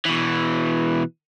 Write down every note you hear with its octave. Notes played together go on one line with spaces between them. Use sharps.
B2 E3